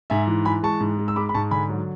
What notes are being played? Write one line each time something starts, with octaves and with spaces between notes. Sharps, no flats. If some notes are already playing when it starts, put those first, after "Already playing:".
G#2 E5 G#5
E3
E3 G#5 B5
G#3 A5 C#6
G#2
G#3
E6
G#3 B5 D6
B5
G#2 A5 C#6
D3 G#5 B5
F#3